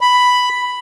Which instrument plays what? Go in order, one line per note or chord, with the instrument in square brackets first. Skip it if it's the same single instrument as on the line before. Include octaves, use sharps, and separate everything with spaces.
[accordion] B5